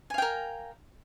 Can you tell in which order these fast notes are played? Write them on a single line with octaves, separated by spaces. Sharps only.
G#5 F5 G5 A#4